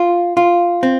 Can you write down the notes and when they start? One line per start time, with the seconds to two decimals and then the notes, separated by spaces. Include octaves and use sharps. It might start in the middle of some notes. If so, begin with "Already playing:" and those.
Already playing: F4
0.37 F4
0.83 C4